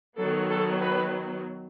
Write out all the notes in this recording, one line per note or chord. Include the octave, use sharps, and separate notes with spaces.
D#3 F#3 B3 A4
A4
B4